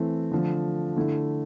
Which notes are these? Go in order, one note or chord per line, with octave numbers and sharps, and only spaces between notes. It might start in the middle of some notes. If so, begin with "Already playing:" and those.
Already playing: E3 A3 C4 E4
D3 F3 A3
D3 A3 E4